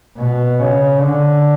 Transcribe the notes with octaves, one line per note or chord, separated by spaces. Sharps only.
B2
C#3
D3